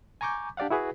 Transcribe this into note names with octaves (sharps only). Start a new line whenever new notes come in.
G#5 A#5 C#6 D6 G6
D4 G4 D5 F5 F#5
E4 F#4 G#4 B4